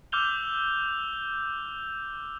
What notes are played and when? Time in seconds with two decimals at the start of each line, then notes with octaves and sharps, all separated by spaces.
0.12 D6 E6 F6 G6 F7 G7